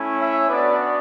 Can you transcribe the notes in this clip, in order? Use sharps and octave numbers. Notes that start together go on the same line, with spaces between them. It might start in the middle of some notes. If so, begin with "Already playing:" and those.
Already playing: A3 C#4 E4
C#5 E5
B3 D4 F#4 B4 D5